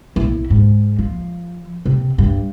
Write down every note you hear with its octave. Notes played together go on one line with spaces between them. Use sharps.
B1 E4
G#2
F3
C3
G2